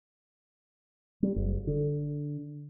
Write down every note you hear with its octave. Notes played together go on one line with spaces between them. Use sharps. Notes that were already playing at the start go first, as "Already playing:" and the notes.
G3
F#1
D3